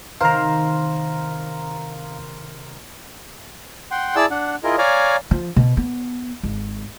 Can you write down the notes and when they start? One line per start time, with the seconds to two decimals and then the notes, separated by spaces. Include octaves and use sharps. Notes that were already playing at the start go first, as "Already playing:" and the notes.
0.21 C3 D#3 D#4 A#4 C5 F5 A#5
3.91 F#5 G5 C6
4.16 E4 G#4 D5 A5 E6
4.31 D4 F#5
4.64 E4 F4 G#4 A#4 D#5
4.78 C#5 D5 F5 G#5 A#5
5.31 F3
5.56 B2
5.77 B3
6.43 G#1